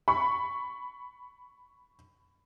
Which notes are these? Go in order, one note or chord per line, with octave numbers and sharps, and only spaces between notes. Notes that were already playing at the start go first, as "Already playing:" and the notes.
B5 C#6